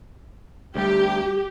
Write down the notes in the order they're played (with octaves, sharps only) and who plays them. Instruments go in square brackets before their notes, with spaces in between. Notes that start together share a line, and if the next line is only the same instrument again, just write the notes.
[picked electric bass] D2 G3 [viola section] G4